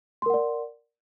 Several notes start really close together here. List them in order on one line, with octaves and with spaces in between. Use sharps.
C6 A#4 F#5 D5